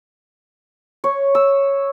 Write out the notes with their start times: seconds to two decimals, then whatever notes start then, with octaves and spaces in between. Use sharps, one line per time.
1.04 C#5
1.35 E6